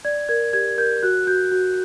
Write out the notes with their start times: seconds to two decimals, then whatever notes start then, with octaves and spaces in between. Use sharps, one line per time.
0.05 D5 G#6
0.29 A#4 G#6
0.53 G4 G#6
0.78 A#4 G6
1.03 F#4 F#6
1.27 F#4 G6
1.52 F#4